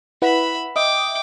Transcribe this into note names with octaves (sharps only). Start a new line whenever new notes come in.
E4 B4 E5 F#5 B5
D#5 E5 G5 D6 D#6